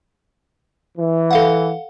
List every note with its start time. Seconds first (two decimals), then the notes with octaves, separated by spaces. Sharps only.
0.98 E3
1.31 A4 F5 F#5